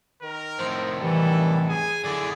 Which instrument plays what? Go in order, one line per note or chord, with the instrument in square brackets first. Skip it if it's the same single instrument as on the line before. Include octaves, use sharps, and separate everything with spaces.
[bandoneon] D#3 [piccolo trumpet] A#4
[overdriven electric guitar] F2 A2 [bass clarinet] C5
[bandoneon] C3 D#3 G3 [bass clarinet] E3 [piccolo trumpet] A4
[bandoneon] G#4 [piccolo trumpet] G#5
[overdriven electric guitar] F#2 E3 [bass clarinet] D3 [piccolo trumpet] D5